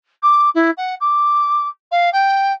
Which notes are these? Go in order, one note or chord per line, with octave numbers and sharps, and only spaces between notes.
D6
E4
F#5
D6
F5
G5